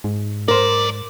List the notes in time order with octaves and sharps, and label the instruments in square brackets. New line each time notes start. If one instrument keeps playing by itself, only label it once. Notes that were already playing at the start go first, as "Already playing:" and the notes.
[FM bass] G#2
[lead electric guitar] F#3 D5 [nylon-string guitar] A#4 C5